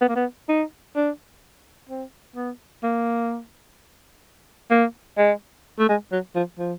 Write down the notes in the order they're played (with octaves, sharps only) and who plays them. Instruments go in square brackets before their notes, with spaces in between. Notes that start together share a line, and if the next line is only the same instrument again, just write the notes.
[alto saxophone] B3
A#3
B3
D#4
D4
C4
B3
A#3
A#3
G#3
A3
G#3
F#3
F3
F3